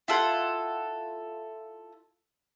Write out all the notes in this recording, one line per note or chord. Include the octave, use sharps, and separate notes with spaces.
E4 F4 A4 F#5